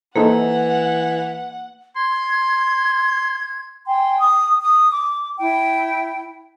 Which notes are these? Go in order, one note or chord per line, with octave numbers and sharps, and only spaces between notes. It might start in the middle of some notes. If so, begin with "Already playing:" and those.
E3 A#3 D#4 A4 C5 F#5
C6 G#6
G5 G#5 C6
D#6
D#6
D6
E4 G5